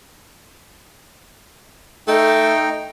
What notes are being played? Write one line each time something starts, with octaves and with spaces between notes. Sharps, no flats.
A3 D#4 G5